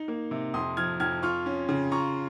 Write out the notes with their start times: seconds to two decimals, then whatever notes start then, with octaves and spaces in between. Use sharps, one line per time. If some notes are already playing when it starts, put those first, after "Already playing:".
Already playing: D#4
0.08 A#3
0.31 C3
0.54 F2 C6 D#6
0.77 F3 F6 G#6
1.00 F2 F6 G#6
1.22 F4 C#6 F6
1.46 C#4
1.69 C#3
1.91 F4 A#5 C#6